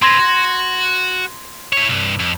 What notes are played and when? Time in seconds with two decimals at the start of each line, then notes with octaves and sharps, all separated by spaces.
0.02 C4 B4 C6 G#6 A#6
0.18 F#4
1.73 E4 C#5
1.89 C2 G2
2.20 F2